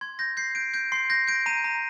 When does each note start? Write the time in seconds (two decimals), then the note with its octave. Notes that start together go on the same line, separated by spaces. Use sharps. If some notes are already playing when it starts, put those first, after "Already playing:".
0.01 C6 G#6
0.19 G6 A#6
0.37 G6 C7
0.55 G6 D7
0.74 G6 D7
0.92 C6 C7
1.10 G6 A#6
1.28 G6 D7
1.46 A#5 D#7
1.64 A#5